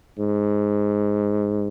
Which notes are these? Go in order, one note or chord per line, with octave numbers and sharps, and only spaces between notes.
G#2